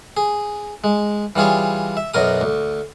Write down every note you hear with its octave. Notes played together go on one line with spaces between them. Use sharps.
G#4
G#3
E3 G3 F4 G#4 C#5
E5
B1 F#2 B2 A#4 D#6
D2